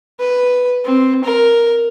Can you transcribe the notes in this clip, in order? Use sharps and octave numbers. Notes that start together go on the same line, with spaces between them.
B4
C4
A#4